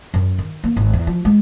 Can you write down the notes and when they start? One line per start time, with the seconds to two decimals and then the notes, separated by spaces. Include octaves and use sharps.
0.14 F#2
0.39 D#3
0.64 A#3
0.76 G#1
0.93 E2
1.07 F3
1.25 G#3